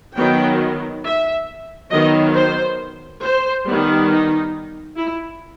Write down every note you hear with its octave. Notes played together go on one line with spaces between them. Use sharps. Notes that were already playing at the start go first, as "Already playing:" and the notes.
D#3 F#3 B3 G5
E5
D#3 F#3 B3 D#5
C5
C5
D#3 G3 B3
D#4
E4